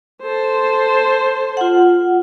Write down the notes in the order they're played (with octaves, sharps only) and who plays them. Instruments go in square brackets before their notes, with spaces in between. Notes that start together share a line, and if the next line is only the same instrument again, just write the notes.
[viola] A4 C5
[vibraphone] F4 F#5